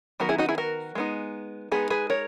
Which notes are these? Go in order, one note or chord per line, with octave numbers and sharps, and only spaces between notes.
D#3 F#3 B3 F#4 A#4
E4 G#4
D#4 F#4
E4 G#4
F#4 A#4
G#3 B3 D#4
G#3 B3 D#4 G#4 B4
G#4 B4
A#4 C#5